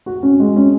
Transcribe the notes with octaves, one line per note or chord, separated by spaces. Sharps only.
F#4
C#4
G#3
C#4